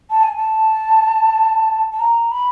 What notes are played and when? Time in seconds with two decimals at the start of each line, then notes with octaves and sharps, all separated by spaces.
0.10 A5
0.23 G#5
0.36 A5
1.92 A5
1.99 A#5
2.31 B5